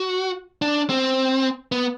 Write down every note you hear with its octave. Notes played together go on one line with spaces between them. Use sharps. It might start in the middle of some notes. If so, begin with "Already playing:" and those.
Already playing: F#4
D4
C4
B3